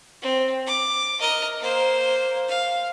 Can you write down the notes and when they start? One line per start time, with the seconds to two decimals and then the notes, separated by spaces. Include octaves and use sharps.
0.22 C4
0.67 D6
1.20 A#4 D#5
1.59 A#3 C5
2.49 F5